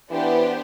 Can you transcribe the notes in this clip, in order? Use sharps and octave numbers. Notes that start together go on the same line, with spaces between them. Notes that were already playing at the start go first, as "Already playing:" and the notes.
E3 B3 D4 G4 C5